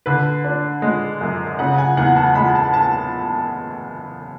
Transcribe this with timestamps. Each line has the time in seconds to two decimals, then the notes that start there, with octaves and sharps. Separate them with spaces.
0.06 D3 B4
0.44 D4
0.82 G#3
1.21 F#2
1.59 C#3 F#5
1.78 G#5
1.97 E2 F#5
2.16 A5
2.35 G#3 B5
2.55 A5
2.74 A5